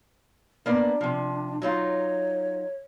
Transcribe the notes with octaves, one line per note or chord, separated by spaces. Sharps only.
A#3 B3 D4 D5
C3 F3
F#3 D#4 F4 C#5